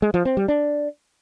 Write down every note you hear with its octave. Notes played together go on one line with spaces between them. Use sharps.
G#3
F3
C4
G3
D4